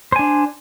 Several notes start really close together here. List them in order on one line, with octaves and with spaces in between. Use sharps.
C5 G#5 D4